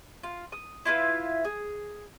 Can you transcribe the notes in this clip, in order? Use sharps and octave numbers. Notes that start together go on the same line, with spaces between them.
F4
D#6
E4 F4 B4 E5
G#4